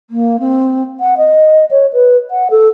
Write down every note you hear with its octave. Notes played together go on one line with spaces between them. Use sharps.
A#3
C4
F#5
D#5
C#5
B4
F#5
A4